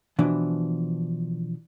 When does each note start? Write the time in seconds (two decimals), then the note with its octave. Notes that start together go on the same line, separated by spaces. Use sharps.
0.19 B2 E3 F3 D4